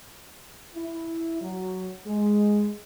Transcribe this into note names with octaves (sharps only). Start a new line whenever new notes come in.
E4
F#3
G#3